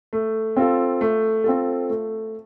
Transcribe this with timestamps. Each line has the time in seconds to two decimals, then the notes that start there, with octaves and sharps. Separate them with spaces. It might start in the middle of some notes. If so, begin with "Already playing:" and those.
0.13 A3
0.56 C4 F4 A4
1.01 A3
1.44 C4 F4 A4
1.90 A3